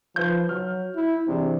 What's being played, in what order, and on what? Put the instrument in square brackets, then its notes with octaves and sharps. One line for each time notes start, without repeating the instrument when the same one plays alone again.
[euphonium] F3 [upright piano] B4 G6
[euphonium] F#3 [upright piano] F6
[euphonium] E4
[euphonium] C3 [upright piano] E3 D4 G#4